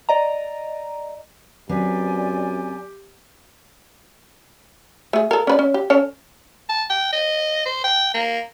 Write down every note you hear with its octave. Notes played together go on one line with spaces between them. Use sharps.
D5 D#5 A#5
F#2 F#3 C4 G4 B4 D5 G#5
A3 G#4
A4 A#4
C#4 B4 D5
C#4
G4
C#4 A4 C#5
A5
G5
D#5
C5
G5
A#3